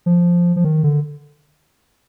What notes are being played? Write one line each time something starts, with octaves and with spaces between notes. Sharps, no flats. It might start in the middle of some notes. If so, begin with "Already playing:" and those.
F3
F3
D#3
D3